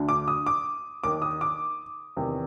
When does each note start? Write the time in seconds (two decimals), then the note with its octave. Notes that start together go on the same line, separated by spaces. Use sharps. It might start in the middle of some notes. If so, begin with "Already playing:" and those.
Already playing: D2 D3
0.09 D6
0.28 D#6
0.46 D6
1.04 D#2 D#3 D6
1.22 D#6
1.41 D6
2.17 E2 C3 D#3